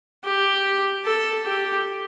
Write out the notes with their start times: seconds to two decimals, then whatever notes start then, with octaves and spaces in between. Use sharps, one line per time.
0.24 G4
1.05 A4
1.46 G4